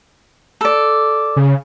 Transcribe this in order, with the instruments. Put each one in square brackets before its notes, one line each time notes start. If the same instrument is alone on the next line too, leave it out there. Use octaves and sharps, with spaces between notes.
[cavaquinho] A4 D5
[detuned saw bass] C#3